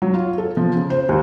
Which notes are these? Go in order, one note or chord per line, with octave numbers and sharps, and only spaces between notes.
F#3
F4
A4
F3
C#3
C5
D#2